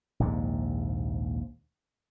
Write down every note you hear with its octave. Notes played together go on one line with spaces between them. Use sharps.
A#1 D#2 G#2 C3